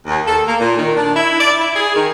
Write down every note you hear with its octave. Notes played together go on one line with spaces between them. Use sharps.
D#2
A4
A#3
A#2
D#3
D4
E4
D5
E4
G#4
D#3